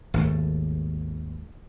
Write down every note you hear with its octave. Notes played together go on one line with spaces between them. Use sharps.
G#1 D#2 A3